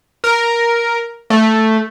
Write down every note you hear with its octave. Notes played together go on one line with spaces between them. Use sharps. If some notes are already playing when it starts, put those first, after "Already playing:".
A#4
A3